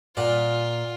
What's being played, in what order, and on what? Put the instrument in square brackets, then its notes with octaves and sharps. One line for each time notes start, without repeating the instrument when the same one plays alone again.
[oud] A#2 [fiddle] F4 [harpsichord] D5 F#5